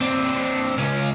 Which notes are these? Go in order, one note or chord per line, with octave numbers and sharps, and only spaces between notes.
C4 D4
C#2 C#4